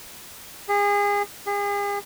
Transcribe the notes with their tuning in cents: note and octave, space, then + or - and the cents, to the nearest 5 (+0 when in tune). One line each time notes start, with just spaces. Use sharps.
G#4 -30
G#4 -40